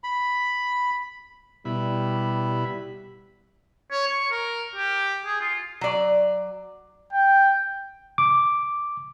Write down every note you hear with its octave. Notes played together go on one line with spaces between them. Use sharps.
B5
B2 G3 E4 B5
C#5
C#6
A#4
G4
G#4
F4
F#3 D5
G5
D6